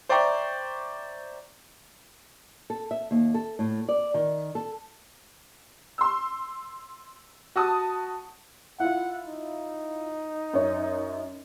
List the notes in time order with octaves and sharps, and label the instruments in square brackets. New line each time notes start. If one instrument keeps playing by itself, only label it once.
[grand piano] C5 D5 E5 G5 A#5 C#6
[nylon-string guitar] A4
E5
D#2
A4
A2
D5
D#3
A4
[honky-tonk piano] C6 E6
F#4 A5 D#6
[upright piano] E4 F4 [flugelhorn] F#5
[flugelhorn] D#4
[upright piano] F#2 C#5